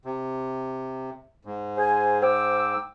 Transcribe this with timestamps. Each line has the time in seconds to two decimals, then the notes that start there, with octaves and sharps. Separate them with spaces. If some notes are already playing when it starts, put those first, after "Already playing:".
0.05 C3
1.45 G#2
1.78 G#4 C5 G#5
2.22 C5 G5 D6 E6